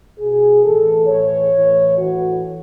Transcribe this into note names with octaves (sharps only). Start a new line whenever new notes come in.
B2 G#4
A2 E3 A4
A2 E3 C#5
A2 E3
A2 E3 F#4